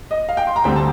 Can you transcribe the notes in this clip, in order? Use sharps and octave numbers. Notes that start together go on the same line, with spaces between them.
D#5
F5
G5
C6
A#5
D2 D3 G3 C4 G5
A5